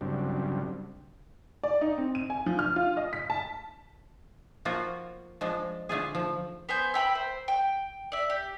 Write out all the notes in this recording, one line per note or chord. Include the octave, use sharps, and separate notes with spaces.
G2 C#3 F#3 G3 C4 D4
D5
D#4
C4
D#7
G#5
F3
F6
F4
D#5
B6
A5
F3 A#3 F4 F#4
F3 G#3 D4
D3 A3 F4 G#4
F3
B3 C5 G#5 G6
E5 G5 A#5 B5
C5
G5
D5 E5
G4